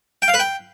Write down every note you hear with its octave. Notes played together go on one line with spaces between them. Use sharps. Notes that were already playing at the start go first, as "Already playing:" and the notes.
G5
F5
B4
G5